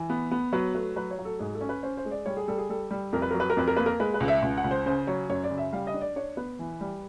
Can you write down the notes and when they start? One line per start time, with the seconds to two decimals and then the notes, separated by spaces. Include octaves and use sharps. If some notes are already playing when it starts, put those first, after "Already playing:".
Already playing: E3
0.10 B3
0.31 B3
0.53 F#3 B4
0.75 A3 B4
0.96 F#3 B4
1.11 C#5
1.19 F#3
1.25 A4
1.39 G#2 G#4
1.55 A4
1.61 C#4
1.69 B4
1.83 C#4 C5
1.97 C5
2.05 G#3
2.11 D5
2.26 G3 C#5
2.37 G#4
2.48 G3 A4
2.58 G#4
2.70 G3 A4
2.91 G3
3.12 F2 A#4
3.22 B4
3.31 F#3 A#4
3.40 B4
3.50 A#4
3.57 F2 B4
3.68 A#4
3.76 A#3 B4
3.86 A#4
4.00 G#3 B4
4.14 B4
4.20 C#2
4.28 E5
4.42 C#2
4.58 F#5
4.64 C#2
4.71 C5
4.86 C#3 C5
5.07 F#3 C#5
5.29 F#2 C#5
5.44 D5
5.51 C#3
5.58 E5
5.73 G3 F5
5.87 D#5
5.94 D4
6.01 D5
6.16 D4 C#5
6.37 B3 B4
6.59 E3
6.81 G3